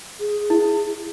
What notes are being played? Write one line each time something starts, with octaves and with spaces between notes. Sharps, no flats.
G#4
E4